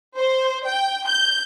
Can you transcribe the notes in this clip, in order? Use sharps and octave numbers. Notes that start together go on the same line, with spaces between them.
C5
G5
G6